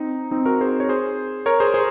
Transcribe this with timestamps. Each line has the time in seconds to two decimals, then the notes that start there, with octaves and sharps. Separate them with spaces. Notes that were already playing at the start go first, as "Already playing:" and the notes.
Already playing: C4 D#4
0.31 C4 D#4
0.46 F#4 A#4
0.61 G#4 C5
0.80 C#5
0.89 G#4 C5
1.46 A#4 C#5
1.60 G#4 C5
1.74 G#4 C5